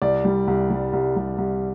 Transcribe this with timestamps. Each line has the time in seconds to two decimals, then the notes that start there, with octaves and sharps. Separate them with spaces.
0.02 C2 D5
0.25 G3
0.47 C2
0.70 G3
0.93 C2
1.16 C2
1.38 C2